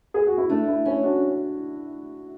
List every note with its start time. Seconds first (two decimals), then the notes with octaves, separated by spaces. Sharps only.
0.14 G#4
0.27 F#4
0.38 E4
0.49 A3 D4
0.68 E4
0.85 C#4 E4
1.03 D4 F#4